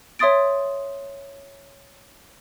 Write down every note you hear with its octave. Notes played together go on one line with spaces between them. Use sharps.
C#5 E5 C6 D#6 A6 D7